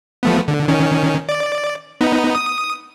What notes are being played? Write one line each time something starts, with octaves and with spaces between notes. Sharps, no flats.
F3 A3 B3
D3
D#3 C#4
D5
B3 D#4
D#6